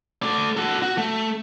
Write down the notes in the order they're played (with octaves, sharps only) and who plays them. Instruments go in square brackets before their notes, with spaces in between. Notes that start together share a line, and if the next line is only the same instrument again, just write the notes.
[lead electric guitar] A3 D5
F#4 A4
F#4
A3